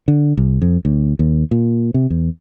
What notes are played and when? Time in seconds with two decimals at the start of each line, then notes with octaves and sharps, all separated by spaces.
0.08 D3
0.37 C2
0.62 F2
0.85 D2
1.19 D#2
1.51 A#2
1.94 C3
2.10 E2